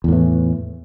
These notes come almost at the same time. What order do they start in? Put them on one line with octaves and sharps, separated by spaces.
E2 A2 E3